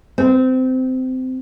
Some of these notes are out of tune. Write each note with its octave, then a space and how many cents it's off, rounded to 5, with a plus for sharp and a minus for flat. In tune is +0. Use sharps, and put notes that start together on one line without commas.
C4 -20